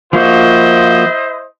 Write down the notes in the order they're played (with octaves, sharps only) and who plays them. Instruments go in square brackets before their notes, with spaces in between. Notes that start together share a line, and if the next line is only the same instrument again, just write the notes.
[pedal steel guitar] F3 A#3 F#4 [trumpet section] E4 C5 D#5